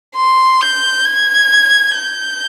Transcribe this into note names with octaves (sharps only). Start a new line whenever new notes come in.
C6
G6
G#6
G6